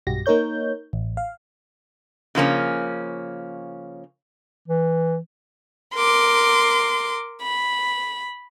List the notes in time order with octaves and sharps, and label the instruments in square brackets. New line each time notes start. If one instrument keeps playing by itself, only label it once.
[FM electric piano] B1 G2 F#4 G4 A#6
A#3 D#4 A#4 C#5 G6
A1
F5
[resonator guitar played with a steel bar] C#3 F3 A#3 C#4
[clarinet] E3
[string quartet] A#4 C6 D6
B5